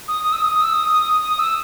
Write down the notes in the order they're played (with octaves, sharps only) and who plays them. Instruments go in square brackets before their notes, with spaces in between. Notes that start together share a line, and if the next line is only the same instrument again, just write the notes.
[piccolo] D#6
D#6
E6
D#6
D#6
E6
D#6
D#6
E6